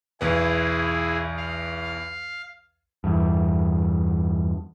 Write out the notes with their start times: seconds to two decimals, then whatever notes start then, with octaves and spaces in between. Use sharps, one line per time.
0.21 B1 E2 B3 E4 G#4
1.37 F5
3.04 E2 G2